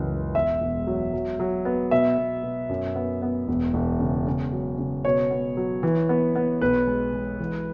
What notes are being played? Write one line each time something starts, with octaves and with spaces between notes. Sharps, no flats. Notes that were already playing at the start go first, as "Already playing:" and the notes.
Already playing: C#2 F#2 E3
G#3
E1 E5
E1
F#3
F#3
F#3
B3
B2 E5
B2
B2
F#2
B3
B3
E1
E1
C#3
C#3
F#3
C#3
B2 C#5
B3
F#3
E3
B3
B3
B1 B4
G#3
G#3
E3